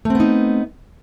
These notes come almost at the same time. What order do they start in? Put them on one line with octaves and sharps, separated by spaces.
A3 C4 B3 D#4